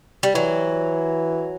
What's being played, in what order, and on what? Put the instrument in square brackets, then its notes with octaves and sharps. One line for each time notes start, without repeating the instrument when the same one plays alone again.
[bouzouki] G3
[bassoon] E3 [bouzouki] F#3